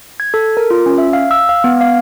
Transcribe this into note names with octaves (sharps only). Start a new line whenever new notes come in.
G#6
A4
A#4
F4
C#4
E5
F5
E6
F5
B3
F5